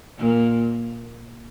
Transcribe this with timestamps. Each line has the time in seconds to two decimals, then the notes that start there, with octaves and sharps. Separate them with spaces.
0.18 A#2 A#3